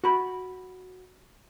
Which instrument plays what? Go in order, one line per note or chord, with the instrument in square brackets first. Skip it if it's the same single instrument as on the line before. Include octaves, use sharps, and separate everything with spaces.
[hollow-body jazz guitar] F#4 B5